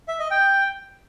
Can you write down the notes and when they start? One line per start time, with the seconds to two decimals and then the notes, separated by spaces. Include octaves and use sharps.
0.08 E5
0.19 D#5
0.31 G5